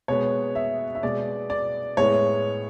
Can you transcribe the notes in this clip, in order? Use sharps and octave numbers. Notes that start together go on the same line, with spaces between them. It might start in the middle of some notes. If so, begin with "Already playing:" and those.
B2 G#3 B3 C#5
E5
E5
B2 G#3 B3 D5
D5
A2 G#3 B3 C#5